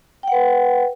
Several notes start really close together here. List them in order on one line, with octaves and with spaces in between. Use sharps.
G5 F#5 B4